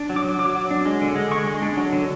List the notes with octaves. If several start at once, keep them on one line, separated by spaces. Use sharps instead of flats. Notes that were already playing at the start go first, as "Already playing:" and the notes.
Already playing: D4
F#3
D6
F#3
F#3 D6
F#3
D4
G#3
D3
G#3
G#3 C#6
G#3
D4
F#3
D3